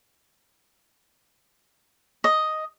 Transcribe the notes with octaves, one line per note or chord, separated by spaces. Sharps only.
D#5